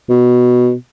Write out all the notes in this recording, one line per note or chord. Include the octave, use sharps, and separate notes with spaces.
B2